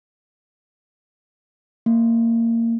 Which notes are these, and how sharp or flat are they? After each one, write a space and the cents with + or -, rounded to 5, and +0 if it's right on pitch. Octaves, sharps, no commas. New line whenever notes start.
A#3 -20